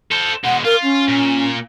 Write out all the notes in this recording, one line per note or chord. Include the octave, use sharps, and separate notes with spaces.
A4 C5
B2 G#3 F#5
F4 A#4
C#4
A#2